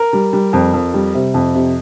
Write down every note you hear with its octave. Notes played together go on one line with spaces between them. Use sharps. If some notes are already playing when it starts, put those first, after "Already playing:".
Already playing: A#4
G3
G3
F2
F2
G3
C3
F2
C3